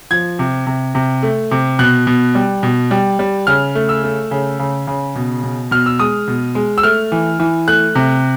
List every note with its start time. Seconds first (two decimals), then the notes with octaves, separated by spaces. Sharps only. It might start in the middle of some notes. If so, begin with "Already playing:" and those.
0.11 F3 G#6
0.39 C3
0.67 C3
0.95 C3
1.23 A3
1.51 C3
1.79 B2 F#6
2.07 B2
2.35 G3
2.63 B2
2.91 G3
3.19 G3
3.47 C#3 F6
3.75 A3
3.89 E6
4.03 A3
4.31 C#3
4.59 C#3
4.87 C#3
5.15 B2
5.43 B2
5.71 B2 F6
5.86 E6
5.99 G#3 D#6
6.28 B2
6.55 G#3
6.78 E6
6.83 A3 F6
7.12 E3
7.40 E3
7.68 A3 F#6
7.95 C3